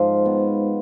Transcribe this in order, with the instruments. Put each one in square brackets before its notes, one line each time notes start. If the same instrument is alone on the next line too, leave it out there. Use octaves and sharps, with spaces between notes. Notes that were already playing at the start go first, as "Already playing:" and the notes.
Already playing: [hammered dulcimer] G#2 F3 F5
B3